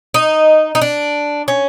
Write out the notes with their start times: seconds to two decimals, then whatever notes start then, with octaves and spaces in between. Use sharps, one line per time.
0.14 D#4
0.75 D#4
0.81 D4
1.48 C#4